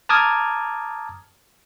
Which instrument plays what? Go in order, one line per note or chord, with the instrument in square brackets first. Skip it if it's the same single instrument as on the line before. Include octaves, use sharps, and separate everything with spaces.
[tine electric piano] A5 A#5 D6 D#6 F6 G#6